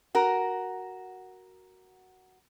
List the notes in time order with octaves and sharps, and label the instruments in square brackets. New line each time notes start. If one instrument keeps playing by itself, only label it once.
[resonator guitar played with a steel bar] F#4 A#4